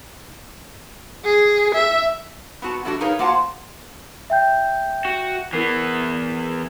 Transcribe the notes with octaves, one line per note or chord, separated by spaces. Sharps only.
G#4
E5
B3 C4 F#4 A5
E3 A3 D4 F#4
D#4 G#4 A#4 B4 C#5 F5
A#3 F4 F#4 C5 F#5 A5
E5 G5 G6
F#4
E3 B3 E4 A#4 C7